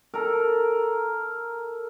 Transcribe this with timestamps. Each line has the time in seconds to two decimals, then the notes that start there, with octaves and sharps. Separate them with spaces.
0.14 A4 A#4